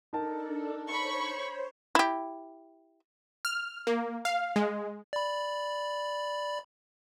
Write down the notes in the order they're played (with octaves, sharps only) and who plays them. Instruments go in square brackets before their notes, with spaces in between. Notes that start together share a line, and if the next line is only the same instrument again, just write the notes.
[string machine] D4 A4 [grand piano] D#4 A#4 A5
[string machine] C5 C#5 [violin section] B5 C#6
[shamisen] E4 G4
[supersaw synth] F6
A#3
F5
G#3
[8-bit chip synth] D5 B5